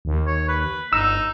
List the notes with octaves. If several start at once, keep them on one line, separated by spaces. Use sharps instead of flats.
D#2
C#5
B4
G1 D#4 E6